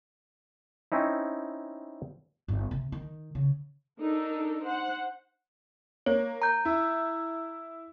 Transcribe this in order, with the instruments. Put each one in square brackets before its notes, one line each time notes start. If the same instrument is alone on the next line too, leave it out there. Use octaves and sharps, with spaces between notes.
[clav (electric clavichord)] C4 C#4 D#4 E4
[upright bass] G1
C3
D#3
C#3
[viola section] D4 D#4 A4 A#4
C5 F#5
[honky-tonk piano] A#3 [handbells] C#5
[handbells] A#5 G6
[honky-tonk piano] E4